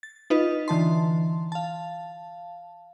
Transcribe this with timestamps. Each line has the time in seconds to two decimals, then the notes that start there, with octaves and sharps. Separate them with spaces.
0.03 A6
0.30 D#4 F4 B4 D#5
0.68 D3 E3 A5 C6
1.52 F5 A5